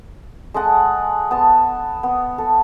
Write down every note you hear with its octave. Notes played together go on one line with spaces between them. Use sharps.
G#3 A4 D#5 F#5
B3 A5
B3
A4